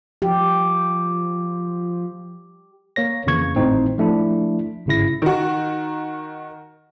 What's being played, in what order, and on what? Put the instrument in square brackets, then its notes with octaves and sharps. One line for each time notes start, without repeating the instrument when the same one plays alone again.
[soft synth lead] F3 [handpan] G4
[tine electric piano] A#3 C#5 A#6
F2 C#3 E3 A#3 C#6 G#6
G#1 A2 C4 D#4 C5
F3 A3 D4 E4
G1 G#2 C#3 E4 A#6
[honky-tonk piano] D#3 F#4